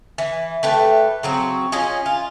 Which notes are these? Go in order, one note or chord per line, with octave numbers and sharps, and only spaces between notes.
E3
A3 G4 B4
C#3 F#3 C4
C#4 F4 G#4 D#5
F4